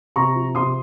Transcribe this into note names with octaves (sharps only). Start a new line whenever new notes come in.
C3 A#5 C#6
F3
C3 C6 D#6